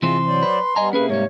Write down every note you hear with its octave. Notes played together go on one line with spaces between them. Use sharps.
C3 E3 C4 F4 G#4 D#5 C6
F#3 C5 D5
B4
G3 B3 D#5 G#5 A#5
C3 A#3 C#4 G4 G#4 B4
G#2 G3 C#5